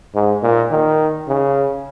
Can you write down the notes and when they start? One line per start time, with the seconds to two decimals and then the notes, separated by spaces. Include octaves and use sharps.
0.15 G#2
0.43 A#2
0.71 D#3
1.28 C#3